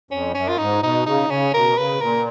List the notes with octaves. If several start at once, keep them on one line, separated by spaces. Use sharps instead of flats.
F2 C#4
F#2 C#4
F4
G#2 D#4
B2 D#4
C#3 D#4
C#3 C#4
B2 A#4
C#3 B4
A#2 A#4